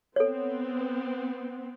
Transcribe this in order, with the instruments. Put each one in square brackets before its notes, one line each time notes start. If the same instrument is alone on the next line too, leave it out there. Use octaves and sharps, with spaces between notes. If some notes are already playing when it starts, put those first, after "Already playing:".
[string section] B3 C4 [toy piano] A4 C#5